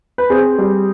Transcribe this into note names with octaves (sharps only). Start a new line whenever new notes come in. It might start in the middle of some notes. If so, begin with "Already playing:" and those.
B4
C4 G#4
G3